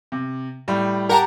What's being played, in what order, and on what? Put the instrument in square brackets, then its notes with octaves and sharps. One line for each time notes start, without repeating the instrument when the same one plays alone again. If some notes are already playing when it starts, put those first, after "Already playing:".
[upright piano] C3
A2 G3
[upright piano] G4 F#5 A5 [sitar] A#4